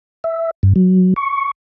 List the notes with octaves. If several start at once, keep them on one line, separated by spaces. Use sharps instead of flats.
E5
G2
F#3
C#6